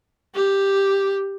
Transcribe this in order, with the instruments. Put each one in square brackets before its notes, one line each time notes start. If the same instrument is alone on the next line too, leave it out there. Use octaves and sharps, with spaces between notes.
[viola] G4